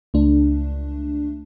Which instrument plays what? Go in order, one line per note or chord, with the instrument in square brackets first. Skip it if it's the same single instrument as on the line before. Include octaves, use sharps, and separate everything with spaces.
[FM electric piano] C#2 A3 D4